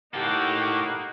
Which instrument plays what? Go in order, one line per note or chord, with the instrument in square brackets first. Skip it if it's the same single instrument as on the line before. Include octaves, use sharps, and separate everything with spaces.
[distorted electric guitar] A2 A4 [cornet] A#3 [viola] D#4 F#5 [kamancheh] G4